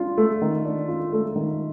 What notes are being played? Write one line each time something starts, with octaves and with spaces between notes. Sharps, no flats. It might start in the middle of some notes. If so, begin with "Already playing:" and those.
Already playing: D4 F4
A3
D#3
D4
F4
A3
D#3